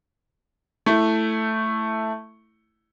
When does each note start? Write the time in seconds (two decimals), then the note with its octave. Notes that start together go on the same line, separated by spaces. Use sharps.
0.86 A3 E4